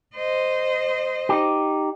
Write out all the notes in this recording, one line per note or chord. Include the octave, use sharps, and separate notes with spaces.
C5 D#5
D#4 G4